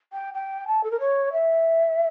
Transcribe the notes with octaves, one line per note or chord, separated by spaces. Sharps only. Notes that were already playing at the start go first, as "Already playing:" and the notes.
G5
G5
A5
A4
A#4
C#5
E5